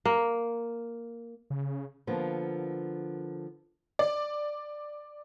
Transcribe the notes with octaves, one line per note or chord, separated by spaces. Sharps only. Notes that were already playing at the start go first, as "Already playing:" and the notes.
A#3
C#3
D3 F3 A#3 B3
D5